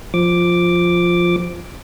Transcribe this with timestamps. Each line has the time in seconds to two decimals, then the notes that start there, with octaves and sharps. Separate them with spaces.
0.14 F3 D6